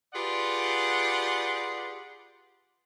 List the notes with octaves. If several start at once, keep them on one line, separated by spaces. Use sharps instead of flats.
F4 G4 G#4 B4 D5 F#5